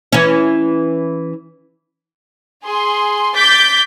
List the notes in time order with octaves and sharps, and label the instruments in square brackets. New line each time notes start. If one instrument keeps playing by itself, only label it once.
[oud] E3 C#4
[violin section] G#4 C6
D6 G6 A6 B6